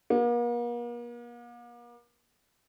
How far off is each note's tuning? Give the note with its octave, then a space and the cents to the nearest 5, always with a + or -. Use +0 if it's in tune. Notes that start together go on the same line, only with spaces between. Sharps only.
A#3 +45